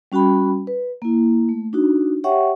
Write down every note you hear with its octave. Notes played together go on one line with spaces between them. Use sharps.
G3 C#4 F#4 G5 B5
B4
A#3 E4
A3
D4 D#4 F#4
G4 C#5 E5 F#5 G5 C#6